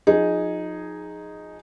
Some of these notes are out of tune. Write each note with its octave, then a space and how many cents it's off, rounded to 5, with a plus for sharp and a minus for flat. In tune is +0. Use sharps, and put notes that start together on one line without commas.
F3 +35 D#4 +0 G#4 +0